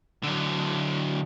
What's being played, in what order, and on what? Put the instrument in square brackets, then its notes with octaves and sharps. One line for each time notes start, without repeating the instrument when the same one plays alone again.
[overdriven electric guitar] D3 F#3